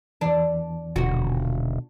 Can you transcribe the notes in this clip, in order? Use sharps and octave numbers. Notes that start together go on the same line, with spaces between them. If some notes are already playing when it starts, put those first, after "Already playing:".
E2 E3 D4
D#1 B2 D3 F#4